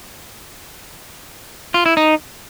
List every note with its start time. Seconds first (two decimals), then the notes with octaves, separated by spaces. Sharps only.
1.74 F4
1.86 E4
1.97 D#4